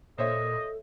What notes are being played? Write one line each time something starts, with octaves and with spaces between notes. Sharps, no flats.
A#2 A4 C5 C#5 D#5 E5